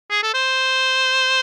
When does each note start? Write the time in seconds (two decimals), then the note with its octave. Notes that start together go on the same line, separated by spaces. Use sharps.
0.10 G#4
0.23 A4
0.34 C5